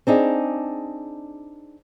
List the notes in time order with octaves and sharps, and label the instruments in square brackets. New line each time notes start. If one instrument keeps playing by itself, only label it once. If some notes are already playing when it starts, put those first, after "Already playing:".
[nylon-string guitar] C4 D4 D#4 G#4